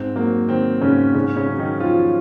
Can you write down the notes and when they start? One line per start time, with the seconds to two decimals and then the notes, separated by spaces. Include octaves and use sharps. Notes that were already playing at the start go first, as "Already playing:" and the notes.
Already playing: G#2 C4
0.16 F#3 A#3
0.49 D#3 C4
0.81 G#2 C#3 C#4
1.14 G#2 C#3 C#4
1.37 C#3 C#4
1.47 F#3
1.59 D#3 D#4
1.80 D#3 F3 F4